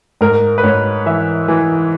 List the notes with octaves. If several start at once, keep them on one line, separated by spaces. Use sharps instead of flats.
G#2 A#4
B4
G#2 C#5
E3 E5
E3